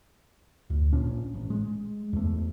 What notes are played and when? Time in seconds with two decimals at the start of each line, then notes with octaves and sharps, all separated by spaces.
0.70 D2
0.93 A#1 A#2 C#4 D4
1.34 A1
1.50 G#3
2.13 E2 A3